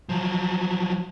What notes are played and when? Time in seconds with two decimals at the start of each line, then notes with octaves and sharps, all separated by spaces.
0.09 F3 F#3